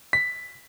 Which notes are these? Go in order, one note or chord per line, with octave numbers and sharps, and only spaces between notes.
B6